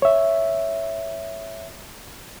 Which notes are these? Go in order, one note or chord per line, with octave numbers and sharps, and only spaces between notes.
C#5 E5